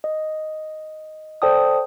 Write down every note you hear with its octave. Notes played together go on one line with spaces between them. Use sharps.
D#5
A4 C5 D5 G5 A5 D#6